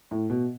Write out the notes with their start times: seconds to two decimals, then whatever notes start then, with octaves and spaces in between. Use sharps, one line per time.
0.11 A2
0.30 B2